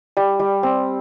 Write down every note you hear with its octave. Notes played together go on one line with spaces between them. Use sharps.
G3
G3
C4